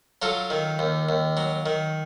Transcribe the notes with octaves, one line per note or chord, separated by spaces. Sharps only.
F#3 F4 A4
D#3
D#2
D#2
F#3
D#3